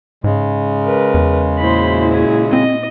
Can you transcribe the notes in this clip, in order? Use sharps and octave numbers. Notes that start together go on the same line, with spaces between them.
G#2 C#3 G#3
A#4 B4
E2
A#2 E4 F#4 C5 B5
G#4
C4 D#5